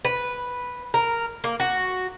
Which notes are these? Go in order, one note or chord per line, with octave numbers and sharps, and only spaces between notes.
B4
A#4
A#3
F#4